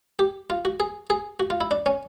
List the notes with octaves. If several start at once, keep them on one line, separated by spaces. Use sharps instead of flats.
G4
F4
F#4
G#4
G#4
F#4
F4
E4
D4
C#4